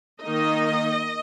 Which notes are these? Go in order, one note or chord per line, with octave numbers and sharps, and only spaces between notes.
D#3 A#3 D#4 D#5